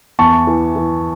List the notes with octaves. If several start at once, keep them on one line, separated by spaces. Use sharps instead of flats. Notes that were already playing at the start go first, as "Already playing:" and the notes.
E2 A5 C#6
E3
E3